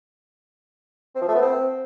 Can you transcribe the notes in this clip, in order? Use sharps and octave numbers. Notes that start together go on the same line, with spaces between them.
C4
F3
A3
B3
C4